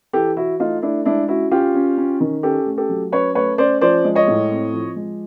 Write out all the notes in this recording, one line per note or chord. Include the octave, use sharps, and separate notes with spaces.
E3 G4 A4
E3 E4 F#4
A3 D#4 F4
A3 D4 E4
G#3 D4 E4
C#4 E4 F#4
C#4 F4 G4
C#4
C#4
D#3
C#4 G4 A4
A3
G4 A4
F#3
C#4 B4 C#5
A3 B4 C#5
C#4 C5 D5
F3 C5 D5
G#3
C#5 D#5
A2
C4
F3
G#3